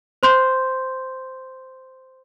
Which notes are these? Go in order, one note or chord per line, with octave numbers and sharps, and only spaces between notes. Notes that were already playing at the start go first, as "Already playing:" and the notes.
C5 C6 G6